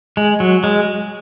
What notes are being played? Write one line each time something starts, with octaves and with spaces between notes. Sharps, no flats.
G#3
F#3
G#3